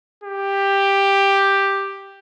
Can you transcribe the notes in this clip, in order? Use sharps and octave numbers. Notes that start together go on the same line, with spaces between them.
G4